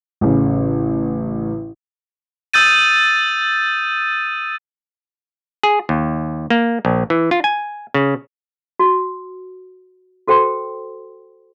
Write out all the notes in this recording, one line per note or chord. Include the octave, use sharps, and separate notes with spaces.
A1 C#3
D#6 E6 G6 A6 D#7
G#4
D#2
A#3
A#1
E3
F4
G#5
C#3
F#4
F#4 A4 C5 G5 C6